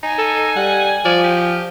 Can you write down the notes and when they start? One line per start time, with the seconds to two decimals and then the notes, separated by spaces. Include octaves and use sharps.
0.03 D#4 G#5
0.18 A4
0.56 G3 F#5
1.05 F3 D5
1.24 G4